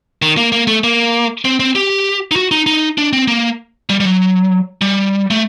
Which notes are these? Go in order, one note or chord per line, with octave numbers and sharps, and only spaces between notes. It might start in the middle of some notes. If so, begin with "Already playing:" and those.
D#3
A#3
A#3
A3
A#3
C4
C4
G4
D#4
F#4
D#4
D#4
D4
C4
A#3
G3
G3
F#3
G3
A3